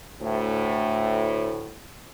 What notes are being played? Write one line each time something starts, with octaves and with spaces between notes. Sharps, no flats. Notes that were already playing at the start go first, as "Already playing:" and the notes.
D2 A2